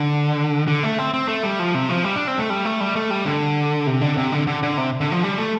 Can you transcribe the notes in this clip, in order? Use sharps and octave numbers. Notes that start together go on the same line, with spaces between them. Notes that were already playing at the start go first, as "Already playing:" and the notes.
Already playing: D3
D3
A3
C4
C4
A3
G3
F3
C3
F3
G3
D4
C4
A3
G3
A3
G3
A3
G3
D3
C3
D3
C3
D3
D3
D3
C3
D3
F3
G3
A3